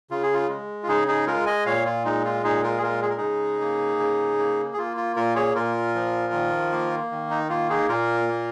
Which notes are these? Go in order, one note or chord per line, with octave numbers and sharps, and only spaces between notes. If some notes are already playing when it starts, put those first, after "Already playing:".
C#3 F4
G#4
F4
G#3
F4
C#3 D#4 G#4
D#4 G#4
G#3 F4 A#4
D#5 G#5
A#2 C#5 F5
F4
G#3 D#4
F4
A#2 D#4 G#4
F4 A#4
G#4
G#3 F4 A#4
G#4
A#4
C#3 D#4 G#4
A#3
C#3
A#3
G#4
A#3 F4
F4
A#2 F4 A#4
G#4 C#5
A#2 F4 A#4
F3
D#3
A#3
D#3
D#4
A#3 F4
D#4 G#4
A#2 F4 A#4
A#3